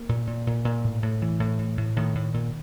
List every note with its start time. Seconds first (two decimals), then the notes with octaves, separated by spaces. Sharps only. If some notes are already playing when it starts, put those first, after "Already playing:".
Already playing: A#3
0.09 A#2
0.27 A#2
0.47 A#2
0.65 A#2
0.84 A2
1.02 A2
1.22 A2 E3
1.40 A2
1.59 A2
1.77 A2
1.96 A2 D#3
2.15 A2
2.34 A#2